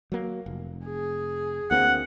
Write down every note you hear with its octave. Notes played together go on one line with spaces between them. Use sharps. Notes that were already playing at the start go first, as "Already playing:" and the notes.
F#3 A#3
F1
G#4
D2 A#3 C4 F#5